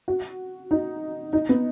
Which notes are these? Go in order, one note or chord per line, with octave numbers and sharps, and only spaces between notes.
F#4
D#4
D#4
B3